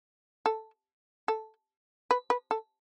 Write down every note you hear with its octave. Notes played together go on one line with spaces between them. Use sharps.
A4
A4
B4
B4
A4